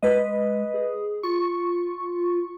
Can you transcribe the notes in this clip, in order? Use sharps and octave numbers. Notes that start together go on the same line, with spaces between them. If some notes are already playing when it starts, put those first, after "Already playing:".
G#3 B4 D#5
G#4
F4 C#6